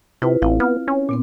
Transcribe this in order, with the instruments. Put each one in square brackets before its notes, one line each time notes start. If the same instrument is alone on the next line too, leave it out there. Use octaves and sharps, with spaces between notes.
[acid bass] C3 [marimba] E4 F4 B4
[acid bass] A1 [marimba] C4 E4 F5
[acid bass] B3 [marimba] F6
[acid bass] C#4
[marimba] A#2 B3 C4